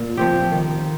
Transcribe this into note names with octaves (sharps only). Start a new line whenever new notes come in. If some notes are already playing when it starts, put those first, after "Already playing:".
Already playing: A#2
F3 C4 G4
D#3